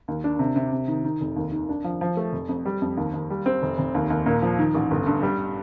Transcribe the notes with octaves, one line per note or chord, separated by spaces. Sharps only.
D#2
D4
C3
C3
C3
D#3
D#3
F1
D#2
D#3
D4
F3
F3
A3
F1
F2
G3
F2
D#2
D#2
G3
C4
F1
F1
D#2
D#2
A#2
F3
D#3
A1
G1
G2
G3